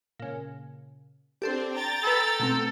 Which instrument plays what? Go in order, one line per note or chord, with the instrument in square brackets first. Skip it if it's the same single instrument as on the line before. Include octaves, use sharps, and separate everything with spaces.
[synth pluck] A#2 C#3
[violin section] C4 D4 C5 [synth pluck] G4 A4 C6
[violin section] G5 A#5 A6
[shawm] A4 [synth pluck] B4 G#5 B5
[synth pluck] B2 A3 C4